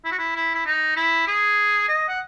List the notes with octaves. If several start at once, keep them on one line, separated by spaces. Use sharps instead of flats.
E4
F#4
E4
E4
E4
D#4
E4
G#4
D#5
F#5